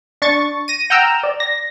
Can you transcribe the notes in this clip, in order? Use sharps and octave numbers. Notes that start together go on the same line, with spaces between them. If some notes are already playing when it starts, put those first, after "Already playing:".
D4 C#6 A6
A#6 D#7
F#5 G5 A#5 E6 F6 G6
D5
A#6